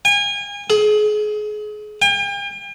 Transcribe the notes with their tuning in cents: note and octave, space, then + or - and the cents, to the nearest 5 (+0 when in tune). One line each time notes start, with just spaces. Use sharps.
G#5 -35
G#4 +30
G5 +45